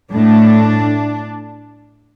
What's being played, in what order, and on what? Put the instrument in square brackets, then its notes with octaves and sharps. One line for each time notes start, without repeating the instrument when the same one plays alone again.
[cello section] A2 A3 D4